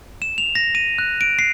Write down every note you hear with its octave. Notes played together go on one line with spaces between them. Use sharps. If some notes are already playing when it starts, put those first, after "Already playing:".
E7
F7
A#6
D#7
F#6
D7
C7